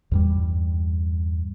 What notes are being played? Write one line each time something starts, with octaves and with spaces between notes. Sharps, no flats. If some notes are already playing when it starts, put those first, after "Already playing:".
E2 G2 G3